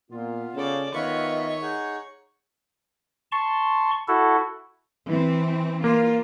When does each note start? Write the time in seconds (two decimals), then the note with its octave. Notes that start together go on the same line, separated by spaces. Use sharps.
0.11 A#2 B3 F4
0.54 C#3 A4 D5
0.94 D#3 B3 F4 C#5 D#5 E5 B5 C#6
1.62 D#4 G#4 F#5
3.32 A5 C6 C#6
4.08 E4 F#4 A4
5.08 E3 C4
5.84 A#3 F4